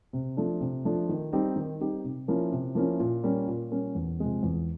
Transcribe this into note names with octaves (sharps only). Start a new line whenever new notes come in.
C3
F3 A3 D4
C3
F3 A3 D4
D#3
G3 C4 D#4 G4
D#3
G3 C4 D#4 G4
C3
F3 A#3 C#4 E4
C3
F3 A#3 C#4 E4
A#2
G3 A#3 C#4
A#2
G3 A#3 C#4
E2
C3 F3 G#3 C4
E2